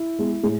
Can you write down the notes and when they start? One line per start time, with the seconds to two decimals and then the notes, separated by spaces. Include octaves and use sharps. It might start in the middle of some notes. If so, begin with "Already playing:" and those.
Already playing: E4
0.19 G#3 B3
0.43 A2 G#4